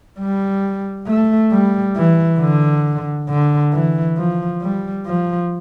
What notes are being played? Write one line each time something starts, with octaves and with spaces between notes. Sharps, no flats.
G3
A3
G3
E3
D3
D3
E3
F3
G3
F3